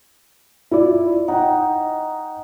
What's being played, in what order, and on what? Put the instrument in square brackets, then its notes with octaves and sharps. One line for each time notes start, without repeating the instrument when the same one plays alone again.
[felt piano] E4 F4 D5
[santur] D#4 [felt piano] F#5 G5